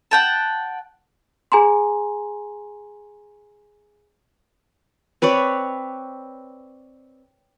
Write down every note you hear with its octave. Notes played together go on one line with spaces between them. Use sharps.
F#5 G5 A5
G#4 G#5 A#5 C6
C4 B4 C#5 D5